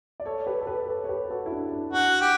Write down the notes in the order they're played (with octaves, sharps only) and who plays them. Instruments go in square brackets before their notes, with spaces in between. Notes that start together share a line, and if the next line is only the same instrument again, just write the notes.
[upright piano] D5
A4 C#5
G4 B4
A4
G4 B4
A4 C#5
C#5
G4 B4
F#4 A4
E4
D4
D4
[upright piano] D4 [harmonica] F#4
[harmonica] G4